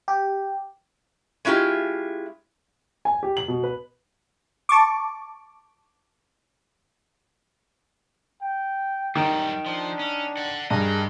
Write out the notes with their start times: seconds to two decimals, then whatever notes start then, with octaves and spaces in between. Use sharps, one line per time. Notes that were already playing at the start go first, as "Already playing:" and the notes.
0.08 G4
1.45 G#3 C#4 E4 F4 G4
3.05 G#5
3.23 G4
3.37 F#7
3.48 B2
3.63 B4
4.69 A5 C#6 D6
8.42 G5
9.15 F#2 D#3 G3
9.66 F3 D4
9.99 C#4
10.37 D5 F#5
10.71 G2 G#4 A#4 D#5